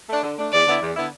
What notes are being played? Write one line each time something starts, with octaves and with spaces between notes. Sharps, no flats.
A3 D4
D3
A3 D4
E2 D5
D3 B3 E4
E2
D3 B3 E4